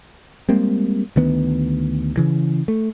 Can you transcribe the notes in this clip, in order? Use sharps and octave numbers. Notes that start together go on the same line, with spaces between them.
G3 G#3 A#3 C4
D2 D#3 B3
C#3 E3
A3